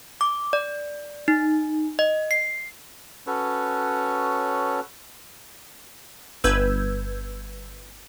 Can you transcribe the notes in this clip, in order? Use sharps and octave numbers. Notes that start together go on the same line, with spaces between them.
D6
D5
D#4
D#5
C7
C#4 F#4 A4 B4 C#5
G1 B4 E6 G6 G#6